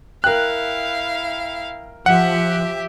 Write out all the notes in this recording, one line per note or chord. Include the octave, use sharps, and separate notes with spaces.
E4 A#4 F5 G5 F#6
F3 G4 E5 F#5